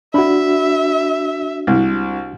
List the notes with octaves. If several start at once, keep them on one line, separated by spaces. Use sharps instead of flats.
D4 F#4 E5 B5
C2